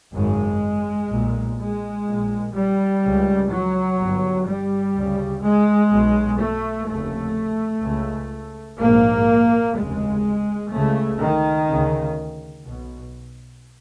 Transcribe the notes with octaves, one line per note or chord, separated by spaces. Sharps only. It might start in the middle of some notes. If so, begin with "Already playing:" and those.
G#1 F#2 C#3 G#3
B1 A#2
G#3
A#1 A#2
G3
C#2 C#3
F#3
G1 G2
G3
D2
C#3
G#3
B1 B2
A3
F1 D#2 C#3 A3
C#2 C#3
A#1 G#2 A#3
F1 D#2 C#3 G#3
C#2 C#3 A3
D#3
D2 C#3
B1 B2